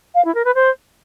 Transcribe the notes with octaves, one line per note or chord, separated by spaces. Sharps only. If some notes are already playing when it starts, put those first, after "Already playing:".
F5
E4
A#4
B4
C5